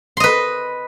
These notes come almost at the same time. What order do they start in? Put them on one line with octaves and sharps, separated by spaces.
C6 D#5 B4